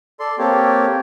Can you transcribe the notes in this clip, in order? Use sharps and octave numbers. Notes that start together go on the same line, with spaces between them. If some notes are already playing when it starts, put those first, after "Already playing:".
A4 D5 C6
A#3 C4 G4 A4 C#5